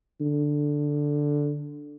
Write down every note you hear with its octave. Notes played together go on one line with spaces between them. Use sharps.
D3